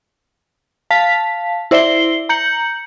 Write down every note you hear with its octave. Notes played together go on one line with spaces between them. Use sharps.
F5 A5 B6
E4 C5 D5 E5 C7 G7
A#5 G6 C#7 F#7